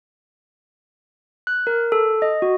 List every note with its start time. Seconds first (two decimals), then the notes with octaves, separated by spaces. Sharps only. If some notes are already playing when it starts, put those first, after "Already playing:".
1.47 F#6
1.67 A#4
1.92 A4
2.22 D#5
2.42 F#4